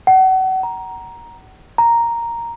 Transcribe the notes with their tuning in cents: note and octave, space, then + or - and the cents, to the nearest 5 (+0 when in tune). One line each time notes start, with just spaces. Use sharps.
F#5 +35
A#5 +10
A#5 +0